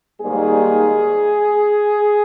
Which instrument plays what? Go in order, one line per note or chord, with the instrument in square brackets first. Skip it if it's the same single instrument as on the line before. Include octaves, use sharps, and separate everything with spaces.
[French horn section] G#2 D#3 G3 A#3 G#4